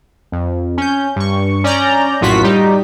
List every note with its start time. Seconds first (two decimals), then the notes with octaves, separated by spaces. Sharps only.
0.32 F2
0.78 C#4 G6
1.16 G2 C#6
1.64 C#4 D5 A#5 G6
2.21 A#1 F#2 A2 F4 F#4 B6
2.43 G3 D#4 G4